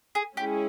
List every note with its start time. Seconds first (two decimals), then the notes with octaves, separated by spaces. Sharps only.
0.15 G#4
0.37 G#3 C#4 E4 G4 G#4